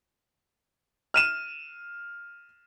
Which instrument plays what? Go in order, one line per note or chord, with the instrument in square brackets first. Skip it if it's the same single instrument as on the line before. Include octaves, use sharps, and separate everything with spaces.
[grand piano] F6 D#7 E7